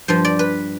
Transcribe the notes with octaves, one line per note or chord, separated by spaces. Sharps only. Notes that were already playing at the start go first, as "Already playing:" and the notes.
G2 F3 C5
D5
B4